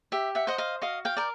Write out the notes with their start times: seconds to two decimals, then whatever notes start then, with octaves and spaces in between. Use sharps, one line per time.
0.12 G4 E5
0.35 E5 F#5
0.47 C5 D#5 F#5
0.58 D#5 F5
0.82 F#4 D#5 F5
1.05 F5 G5
1.17 A#4 D5